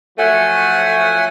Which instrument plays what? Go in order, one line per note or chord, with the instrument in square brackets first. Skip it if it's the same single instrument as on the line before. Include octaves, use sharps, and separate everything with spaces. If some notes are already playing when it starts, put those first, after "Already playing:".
[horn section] F3 F#3 A3 [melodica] F#5 G#5